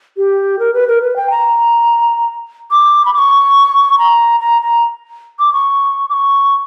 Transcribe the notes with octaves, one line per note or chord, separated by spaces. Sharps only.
G4
A#4
B4
A#4
B4
G5
A#5
D6
B5
D6
C#6
A#5
A#5
A#5
D6
C#6
D6
C#6